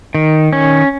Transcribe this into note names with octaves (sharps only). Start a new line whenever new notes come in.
D#3
C#4